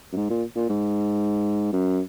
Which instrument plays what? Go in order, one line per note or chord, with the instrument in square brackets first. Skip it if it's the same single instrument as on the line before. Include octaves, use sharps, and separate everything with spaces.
[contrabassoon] F#2
G#2
A#2
A#2
G#2
F#2